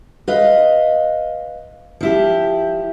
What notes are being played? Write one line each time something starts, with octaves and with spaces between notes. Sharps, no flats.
B4 D#5 F5
F3 E4 G4